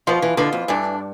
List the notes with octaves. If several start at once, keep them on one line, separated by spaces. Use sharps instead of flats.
B2 F3 B3 F4
E3
B2 D3 B3 F4
F2
G2 E3 A3 D4